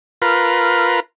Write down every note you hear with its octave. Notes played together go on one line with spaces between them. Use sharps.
F4 A#4 B4